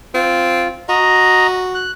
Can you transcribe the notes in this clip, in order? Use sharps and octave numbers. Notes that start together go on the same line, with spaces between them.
C4 F4
F#4 D#5 A#5
F#6